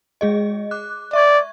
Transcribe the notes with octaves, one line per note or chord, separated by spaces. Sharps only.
G#3 G#4 D#5
D6 F#6
D5 E5 C#6 G#6